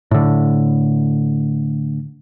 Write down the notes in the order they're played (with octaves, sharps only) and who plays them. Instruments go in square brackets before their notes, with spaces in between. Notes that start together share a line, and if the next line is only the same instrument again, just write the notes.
[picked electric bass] A2 D3